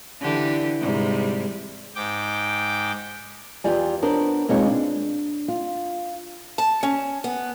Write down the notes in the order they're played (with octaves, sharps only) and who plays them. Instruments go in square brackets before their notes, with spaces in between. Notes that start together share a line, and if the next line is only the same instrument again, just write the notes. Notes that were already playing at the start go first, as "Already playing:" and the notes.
[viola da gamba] D3 E3 G4
G#2 C3 G3
[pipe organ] G#2 G5 D6
[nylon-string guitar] E2 F4 G4 D5 G#5
B3 D4 A#4 C5 C#5
B2 G#3 C4 D#4 F4 C#5
D4
F4
[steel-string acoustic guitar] A5
C#4
B3